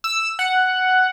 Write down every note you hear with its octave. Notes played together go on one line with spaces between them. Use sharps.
E6
F#5